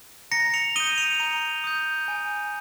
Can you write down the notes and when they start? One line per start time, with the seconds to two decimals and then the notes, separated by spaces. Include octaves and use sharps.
0.31 A#5 A#6 C#7
0.54 C#7 F7
0.76 D#6 D#7 G7
0.80 G6
0.98 C#7 F7
1.20 A#5
1.64 D#6 G6
2.08 G#5